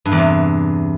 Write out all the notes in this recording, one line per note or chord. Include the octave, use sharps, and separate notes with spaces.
G2
E2
C3